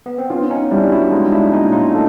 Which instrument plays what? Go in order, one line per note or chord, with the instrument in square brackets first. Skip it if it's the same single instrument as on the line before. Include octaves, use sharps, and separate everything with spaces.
[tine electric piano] B3
C4
[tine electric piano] B3 C#4 [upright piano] F4
[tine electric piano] C#4 D#4
[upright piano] G3 [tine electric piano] D4 E4
[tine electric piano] E4 F#4
[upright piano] G#3 [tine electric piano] D#4 F4
[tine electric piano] D4 E4
[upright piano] A#2 [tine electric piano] C#4 D#4
[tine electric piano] D#4 F4
[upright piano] A3